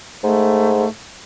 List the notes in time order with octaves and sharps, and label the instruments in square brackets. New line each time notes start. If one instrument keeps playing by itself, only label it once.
[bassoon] G#2 [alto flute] A3